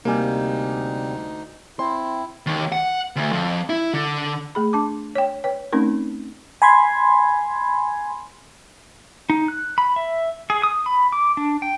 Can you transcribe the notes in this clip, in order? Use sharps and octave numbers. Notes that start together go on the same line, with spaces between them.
D2 C3 G3 A#3 D#4 G#5
C4 E4 C6
D#2
F#5
D2
F2
E4
D3
A3 G#4 B5
D4 A5 D6
C#5 G5
B4 C#5 G5
A3 C4 C#4 D#4 A#4
G#5 B5 C6 G#6
D#4
F#6
B5
E5
G#4
D#6
B5
D6
D4
G5